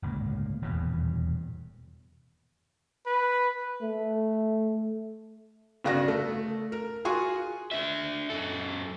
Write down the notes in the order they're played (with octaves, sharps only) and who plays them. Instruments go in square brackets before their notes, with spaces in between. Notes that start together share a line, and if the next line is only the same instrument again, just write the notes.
[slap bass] G1 C#2 A2 A#3
D#1 E2 G2 B2
[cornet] B4
[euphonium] A3
[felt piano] G1 C#3 F#4 D5 A#6
A3
A#4
F4 F#4 G#4 G#5 C6 C#6
[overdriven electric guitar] D4 E5
F#2 A4